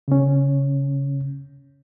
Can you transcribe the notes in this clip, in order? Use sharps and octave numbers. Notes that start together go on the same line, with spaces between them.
C#3 C#4